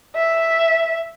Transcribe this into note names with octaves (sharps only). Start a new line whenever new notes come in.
E5